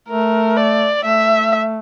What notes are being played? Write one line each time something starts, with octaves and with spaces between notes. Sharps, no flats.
A3 A#4
D5
A3 E5